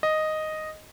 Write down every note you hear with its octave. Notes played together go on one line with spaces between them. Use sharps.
D#5